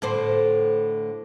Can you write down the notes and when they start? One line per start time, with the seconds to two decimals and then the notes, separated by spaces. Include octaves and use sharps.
0.02 A2 D3 C5